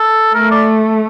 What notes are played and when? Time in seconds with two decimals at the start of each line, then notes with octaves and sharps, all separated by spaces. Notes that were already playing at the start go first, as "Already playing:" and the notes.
Already playing: A4
0.34 A3 A#4
0.51 D5